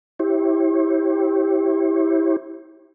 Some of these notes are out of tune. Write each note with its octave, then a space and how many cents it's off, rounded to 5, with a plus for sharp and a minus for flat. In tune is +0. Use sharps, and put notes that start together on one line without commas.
E4 -10 G4 +0 C#5 -45